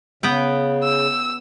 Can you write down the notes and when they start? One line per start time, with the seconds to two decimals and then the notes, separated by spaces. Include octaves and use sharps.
0.23 C#3 B3 B4 G5
0.83 E6